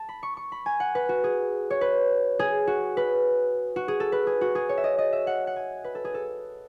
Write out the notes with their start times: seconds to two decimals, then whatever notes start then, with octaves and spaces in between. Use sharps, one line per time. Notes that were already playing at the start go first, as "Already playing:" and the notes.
Already playing: A5
0.09 B5
0.23 C#6
0.37 C#6
0.52 B5
0.66 G#5
0.80 F#5
0.95 B4
1.09 F#4
1.24 G#4
1.70 C#5
1.81 B4
2.39 G#4
2.67 F#4
2.97 B4
3.76 F#4
3.88 G#4
4.00 A4
4.12 B4
4.27 G#4
4.41 F#4
4.55 G#4
4.69 C#5
4.78 E5
4.84 D#5
4.98 D#5
5.13 E5
5.27 F#5
5.47 F#5
5.56 G#5
5.84 B4
5.95 A4
6.05 G#4
6.14 A4